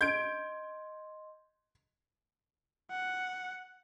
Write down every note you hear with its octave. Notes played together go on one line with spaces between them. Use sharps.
D#5 C6 G6 G#6 D7
F#5